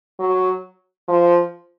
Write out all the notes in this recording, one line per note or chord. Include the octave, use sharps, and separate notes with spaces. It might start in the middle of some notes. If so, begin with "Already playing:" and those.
F#3
F3